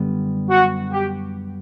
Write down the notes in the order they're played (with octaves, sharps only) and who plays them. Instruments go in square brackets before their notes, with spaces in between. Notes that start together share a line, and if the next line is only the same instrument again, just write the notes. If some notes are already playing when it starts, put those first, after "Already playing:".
Already playing: [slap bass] F#2 D3 G3 B3
[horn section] F#4
G4